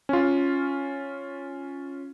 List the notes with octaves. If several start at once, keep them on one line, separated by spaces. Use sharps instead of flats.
C#4 F4